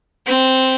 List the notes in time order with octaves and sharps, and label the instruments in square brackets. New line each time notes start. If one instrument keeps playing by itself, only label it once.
[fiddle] C4